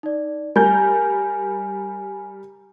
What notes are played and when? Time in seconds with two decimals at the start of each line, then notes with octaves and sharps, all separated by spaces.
0.03 D#4 D5
0.56 G3 A#4 G#5 G6